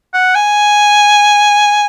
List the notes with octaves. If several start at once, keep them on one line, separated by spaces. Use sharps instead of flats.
F#5
G#5